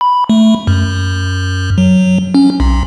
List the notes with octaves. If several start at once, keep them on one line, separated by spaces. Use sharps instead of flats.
B5
A3
F#2
F#3
C#4
B1